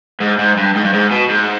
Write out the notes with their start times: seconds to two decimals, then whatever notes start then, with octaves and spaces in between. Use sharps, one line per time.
0.21 G#2
0.39 G#2
0.57 G2
0.75 G#2
0.84 G2
0.93 G#2
1.11 B2
1.29 G#2